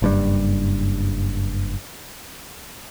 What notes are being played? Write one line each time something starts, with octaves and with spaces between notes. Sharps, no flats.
F#1 G2 G3